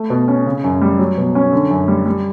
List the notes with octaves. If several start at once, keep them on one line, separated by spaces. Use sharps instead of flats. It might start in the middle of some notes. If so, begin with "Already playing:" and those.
Already playing: A3
B2
C#4
C#3
F#2
G3
F#3
B2
C#4
D3
F#2
G3
G3